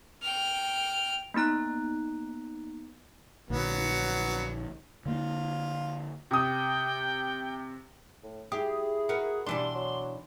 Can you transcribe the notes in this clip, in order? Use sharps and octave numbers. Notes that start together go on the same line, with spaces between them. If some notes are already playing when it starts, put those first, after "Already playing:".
G5 F6
A#3 B3 D#4 A#5 F#6
A#1 A#2 D3 F#3 B3
D3 A#3 F4
C3 G5 D#6
A2
E4 G4 G#4
F#4 A#4 B4
B2 E3 G3 D4 C6
F#3